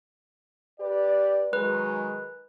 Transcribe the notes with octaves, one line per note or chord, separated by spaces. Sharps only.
G4 B4 D5
D#3 F#3 G#3 B4